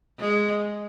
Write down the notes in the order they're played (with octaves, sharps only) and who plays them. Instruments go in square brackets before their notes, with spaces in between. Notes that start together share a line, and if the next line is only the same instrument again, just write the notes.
[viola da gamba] G#3